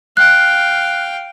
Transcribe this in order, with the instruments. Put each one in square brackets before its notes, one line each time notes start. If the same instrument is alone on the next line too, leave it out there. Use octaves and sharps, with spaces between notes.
[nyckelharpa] F5 G5 [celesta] F#6